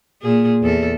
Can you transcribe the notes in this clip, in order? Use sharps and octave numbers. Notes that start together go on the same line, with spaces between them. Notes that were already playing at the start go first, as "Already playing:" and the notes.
A#2 G#4
E2 A4